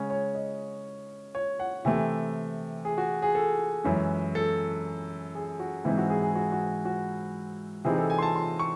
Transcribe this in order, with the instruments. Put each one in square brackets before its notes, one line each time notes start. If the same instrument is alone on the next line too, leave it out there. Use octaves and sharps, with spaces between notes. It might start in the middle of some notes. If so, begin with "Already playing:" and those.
Already playing: [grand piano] C#3 G#3 C#4
C#5
D#5
C#5
F#5
C3 E3 A3 G#5
G#4
F#4
G#4
A4
F#2 E3 G#3 C#4
A4
G#4
F#4
G#2 E3 G#3 C4 E4
F#4
G#4
G#4
F#4
F#4
F#4
C3 E3 C4 D#4 G#4
A4
G#5
C6
A5
C6
C#6